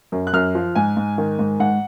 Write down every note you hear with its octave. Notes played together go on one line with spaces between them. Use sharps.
F#2
F#6
F#2 F6
F3
G#2 G#5
G#2
D#3
G#2
G#2 F#5